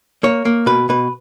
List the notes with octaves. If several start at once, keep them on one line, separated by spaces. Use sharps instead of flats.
A#3 C#5
A#3
B2 B4
B2 B4